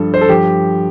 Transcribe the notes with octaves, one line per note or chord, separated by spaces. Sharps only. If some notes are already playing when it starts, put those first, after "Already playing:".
Already playing: G2 F3 A4
C5
A4
G2 F3 G4